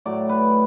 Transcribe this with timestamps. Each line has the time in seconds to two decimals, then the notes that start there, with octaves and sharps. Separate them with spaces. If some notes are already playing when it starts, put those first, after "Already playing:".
0.05 A2 F#3 A3 D5
0.29 B4